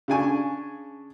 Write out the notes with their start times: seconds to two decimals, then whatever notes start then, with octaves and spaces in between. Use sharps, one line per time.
0.08 C#3 D4 G#5 C#6